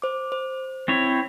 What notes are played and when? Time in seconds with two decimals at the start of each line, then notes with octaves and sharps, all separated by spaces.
0.02 C5 D6
0.32 C5
0.88 C4 E4 C#5